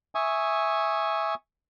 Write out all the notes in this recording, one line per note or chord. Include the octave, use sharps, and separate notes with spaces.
E5 G#5 C#6 D#6